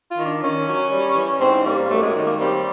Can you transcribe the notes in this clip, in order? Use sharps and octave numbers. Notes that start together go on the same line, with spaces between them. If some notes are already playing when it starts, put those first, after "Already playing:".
F4
D#3
D4
D#3 C#4
F#3
G3
E3
G#2 C4
G3 A#3
F#2 A3
G#3
D#3
A#3
G3 C4